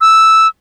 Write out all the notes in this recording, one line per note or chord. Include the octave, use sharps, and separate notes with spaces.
E6